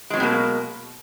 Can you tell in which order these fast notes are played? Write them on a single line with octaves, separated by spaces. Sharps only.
G#3 F#3 C4 B2 A#3